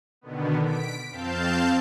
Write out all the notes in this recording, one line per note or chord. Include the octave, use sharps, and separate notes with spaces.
B2 D3 D#3 B3
B6 D7
F2 C4 F5 A5 G6